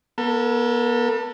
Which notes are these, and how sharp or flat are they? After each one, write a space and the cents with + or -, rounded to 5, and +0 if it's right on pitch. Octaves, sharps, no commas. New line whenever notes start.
B3 -40 A4 +30